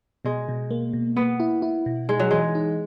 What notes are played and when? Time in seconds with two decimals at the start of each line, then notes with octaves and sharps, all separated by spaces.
0.25 B2 G#3
0.49 B2
0.71 A#3
0.93 B2
1.16 A#3 B3
1.40 E4
1.62 E4
1.86 B2
2.09 G#3 D#4
2.20 F#3
2.31 E3 G#3
2.55 D#4